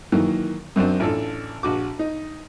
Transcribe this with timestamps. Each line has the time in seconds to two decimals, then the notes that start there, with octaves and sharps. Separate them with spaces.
0.12 D#3 E3 F#3 A#3
0.76 F#2 F#3 C4 D4
1.00 A1 D4 F4 A4
1.63 A#1 F#4 D6
1.99 D#4